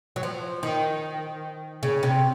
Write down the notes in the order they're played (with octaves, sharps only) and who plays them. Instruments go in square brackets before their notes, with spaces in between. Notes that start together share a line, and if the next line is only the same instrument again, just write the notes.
[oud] F#3
F3
D#3
C#3
C3